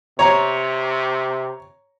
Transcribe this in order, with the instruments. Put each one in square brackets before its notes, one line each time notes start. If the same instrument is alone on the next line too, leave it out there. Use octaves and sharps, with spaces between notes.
[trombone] C3 [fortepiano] C#5 A#5